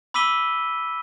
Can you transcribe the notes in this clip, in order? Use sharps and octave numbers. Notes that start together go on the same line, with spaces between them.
B5 D6 E6 B6 D#7 G7